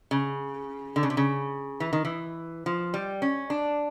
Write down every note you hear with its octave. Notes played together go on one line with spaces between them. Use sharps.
C#3
D3
C#3
C3
C#3
E3
D#3
E3
F3
G3
C#4
D4